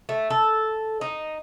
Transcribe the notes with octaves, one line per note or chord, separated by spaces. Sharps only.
A3
A4
D#4